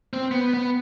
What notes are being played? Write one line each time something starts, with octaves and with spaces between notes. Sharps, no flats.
C4 C5
B3
B3